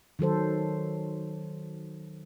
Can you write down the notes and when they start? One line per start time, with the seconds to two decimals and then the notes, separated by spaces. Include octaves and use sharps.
0.19 D#3 F#3 A4 C5